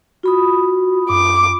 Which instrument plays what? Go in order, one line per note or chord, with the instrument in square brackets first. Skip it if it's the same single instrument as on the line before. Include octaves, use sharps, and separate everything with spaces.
[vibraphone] F4 B5 D#6 [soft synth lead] F#4
[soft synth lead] F#2 [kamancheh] D6